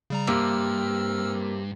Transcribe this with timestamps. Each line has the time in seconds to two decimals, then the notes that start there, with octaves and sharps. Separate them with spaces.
0.10 C#3 G3 A#5
0.27 G2 C3 A#3 E6 F6